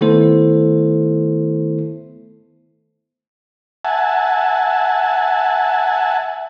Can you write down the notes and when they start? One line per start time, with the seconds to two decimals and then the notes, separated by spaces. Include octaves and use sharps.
0.01 D#3 A3 B3 E4 A4 C5
3.85 E5 F#5 G#5 A5